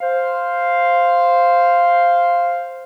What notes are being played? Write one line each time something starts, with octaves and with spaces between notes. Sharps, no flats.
C5 F5